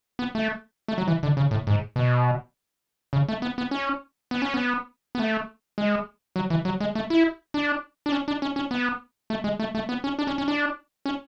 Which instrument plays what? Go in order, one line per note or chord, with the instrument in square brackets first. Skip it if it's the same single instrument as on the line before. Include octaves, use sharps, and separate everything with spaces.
[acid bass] B3
A3
A3
F#3
E3
D3
C#3
A2
G#2
B2
C#3
A3
B3
B3
C#4
B3
C#4
B3
B3
A3
G#3
F#3
E3
F#3
G#3
A3
E4
D4
D4
C#4
D4
C#4
C#4
B3
A3
G#3
A3
A3
B3
C#4
D4
C#4
C#4
D4
C#4